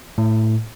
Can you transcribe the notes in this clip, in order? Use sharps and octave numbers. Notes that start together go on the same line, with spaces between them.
A2